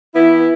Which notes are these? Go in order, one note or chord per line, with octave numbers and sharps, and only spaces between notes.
E3 B3 E4